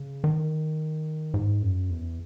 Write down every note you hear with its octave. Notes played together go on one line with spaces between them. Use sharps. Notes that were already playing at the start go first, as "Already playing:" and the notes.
Already playing: C#3
D#3
G#2
F#2
E2